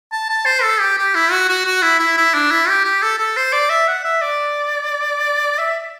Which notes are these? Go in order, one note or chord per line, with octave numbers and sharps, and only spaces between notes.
A5
A5
C5
A4
G4
G4
E4
F#4
F#4
F#4
E4
E4
E4
D4
E4
G4
G4
A4
A4
C5
D5
E5
F#5
E5
D5
E5